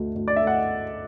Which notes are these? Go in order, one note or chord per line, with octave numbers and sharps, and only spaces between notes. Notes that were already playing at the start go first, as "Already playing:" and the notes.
Already playing: D2 A3
D2
D5
E5
A3
F#5